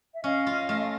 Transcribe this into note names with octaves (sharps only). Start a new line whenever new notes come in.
E5
C#4 D#5 F5
F4
A3